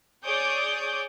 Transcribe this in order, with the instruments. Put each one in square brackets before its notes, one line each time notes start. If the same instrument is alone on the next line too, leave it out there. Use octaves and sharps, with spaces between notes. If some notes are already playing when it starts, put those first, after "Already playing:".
[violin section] G#4 C#5 D5 D6 D#6 G6